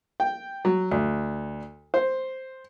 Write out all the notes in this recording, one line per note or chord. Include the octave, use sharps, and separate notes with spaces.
G5
F#3
D2
C5